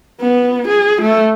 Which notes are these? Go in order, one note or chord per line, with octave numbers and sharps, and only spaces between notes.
B3
G#4
A3